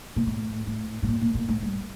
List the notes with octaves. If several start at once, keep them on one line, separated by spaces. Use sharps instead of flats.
A#2
A2
A2
A2
A#2
A#2
A#2
A2
G2